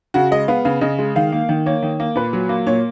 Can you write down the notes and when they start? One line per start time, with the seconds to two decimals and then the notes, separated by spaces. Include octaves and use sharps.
0.14 C#3 F#4
0.31 G#3 D#5
0.48 B3 F5
0.65 C#3 F5
0.81 C#3 D#5
0.99 G#3
1.16 D#3 F5
1.32 A#3
1.49 D#3
1.66 A#3 C#5
1.82 D#3
2.00 A#3
2.16 A#2 B4
2.33 F#3
2.49 A#3
2.67 A#2 C#5